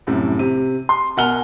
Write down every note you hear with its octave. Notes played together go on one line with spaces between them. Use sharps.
C2 F#2 A2
C3 D#7
C6
B2 A#4 F#5 G#5 F6 G7